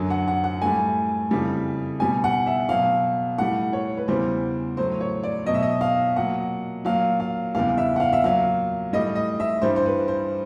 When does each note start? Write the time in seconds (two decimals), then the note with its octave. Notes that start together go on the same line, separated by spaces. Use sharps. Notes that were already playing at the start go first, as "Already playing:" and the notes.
Already playing: F#2 D3 F#3
0.10 F#5
0.28 F#5
0.44 F#5
0.62 A2 E3 G3 G#5
1.31 F2 C#3 E3 G3
2.00 B2 G3 G#5
2.24 F#5
2.47 E5
2.69 B2 F#3 F5
3.38 A2 E3 G3 F#5
3.73 C#5
3.97 B4
4.08 E2 C#3 E3 G3 C5
4.77 A2 F#3 C5
5.01 C#5
5.23 D5
5.46 B2 F#3 D#5
5.54 E5
5.63 D#5
5.81 F5
6.16 A#2 F#3 F#5
6.85 A#2 F#3 F5
7.20 F5
7.55 E2 C#3 E3 G3 F5
7.78 E5
7.96 F#5
8.00 F5
8.13 E5
8.24 A#2 F#3 F5
8.93 A2 E3 G3 D#5
9.15 D#5
9.40 E5
9.62 G2 E3 G3 C5
9.76 C5
9.86 B4
10.08 C5